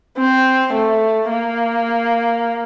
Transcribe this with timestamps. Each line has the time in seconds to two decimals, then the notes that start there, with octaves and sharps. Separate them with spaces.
0.18 C4
0.74 A3
1.30 A#3